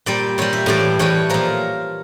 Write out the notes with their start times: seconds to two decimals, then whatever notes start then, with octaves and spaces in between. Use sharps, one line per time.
0.06 A#2 G3 D5
0.38 A#2 G3 C#5
0.53 E5
0.66 A2 E3 G3 D5
0.99 A2 E3 G3 C#5
1.29 A#2 F3 A#4